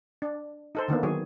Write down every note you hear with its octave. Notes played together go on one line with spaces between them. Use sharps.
D4
D#4 A4 C5
D3 D#3 A#3 B3
D#3 F#3 G#4 C#5